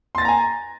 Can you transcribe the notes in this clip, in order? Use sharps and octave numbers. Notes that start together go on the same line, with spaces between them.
G#5 A#5 C6 A6 A#6